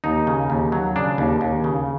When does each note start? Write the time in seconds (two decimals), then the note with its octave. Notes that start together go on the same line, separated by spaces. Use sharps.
0.04 D#2 D#4
0.27 C#3
0.50 D#2
0.72 F#3
0.96 C#3 D4
1.18 D#2
1.41 D#2
1.64 C#3